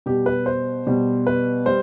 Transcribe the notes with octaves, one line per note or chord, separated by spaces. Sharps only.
B2 G3 G4
B4
C5
B2 G3
B4
G3 C5